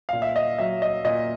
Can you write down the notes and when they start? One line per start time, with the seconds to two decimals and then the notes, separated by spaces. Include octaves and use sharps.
0.09 A#2 F5
0.22 E5
0.36 D#5
0.58 F#3 E5
0.82 D#5
1.05 A#2 D#5